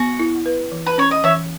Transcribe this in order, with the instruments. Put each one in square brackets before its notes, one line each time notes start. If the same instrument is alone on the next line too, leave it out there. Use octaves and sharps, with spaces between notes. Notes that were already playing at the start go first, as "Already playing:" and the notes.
Already playing: [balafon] B3 [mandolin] F#4
[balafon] E4
B4
E3
[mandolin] B4
[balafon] C#4 [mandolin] C#5
[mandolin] D#5
[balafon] E3 [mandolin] C#5 E5